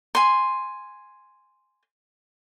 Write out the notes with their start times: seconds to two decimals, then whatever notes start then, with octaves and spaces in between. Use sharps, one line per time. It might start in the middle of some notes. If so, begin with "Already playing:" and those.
0.15 G#5 C6